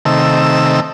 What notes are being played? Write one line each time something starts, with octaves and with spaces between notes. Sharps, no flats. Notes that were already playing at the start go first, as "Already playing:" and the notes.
C3 D#3 A3 E6